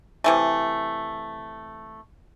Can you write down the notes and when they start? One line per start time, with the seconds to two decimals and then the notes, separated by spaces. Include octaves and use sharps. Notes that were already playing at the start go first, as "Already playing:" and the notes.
0.24 C3 E3 A3